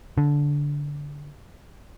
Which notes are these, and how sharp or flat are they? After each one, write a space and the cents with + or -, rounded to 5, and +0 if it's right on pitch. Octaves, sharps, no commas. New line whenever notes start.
D3 -15